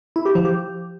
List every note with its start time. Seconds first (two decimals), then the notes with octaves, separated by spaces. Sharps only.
0.16 E4
0.25 G4
0.35 F3
0.45 G4